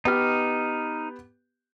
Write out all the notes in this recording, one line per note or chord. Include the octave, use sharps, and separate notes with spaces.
B3 D#4 G4 F6